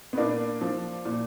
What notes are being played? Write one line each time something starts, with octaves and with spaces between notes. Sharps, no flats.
B3
A#2 A#3 D4
F3
A#2